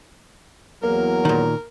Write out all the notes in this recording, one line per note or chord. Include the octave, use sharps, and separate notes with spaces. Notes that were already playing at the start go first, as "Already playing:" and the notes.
E2 F#3 A#3 A#4
A#2 D#3